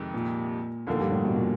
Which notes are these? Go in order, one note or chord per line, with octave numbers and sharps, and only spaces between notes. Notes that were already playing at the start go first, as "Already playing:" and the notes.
Already playing: F2 C3 D#3 G#3
A#2
D#2 A#2 D3 F3 A#3
G2
A2
B2
A#2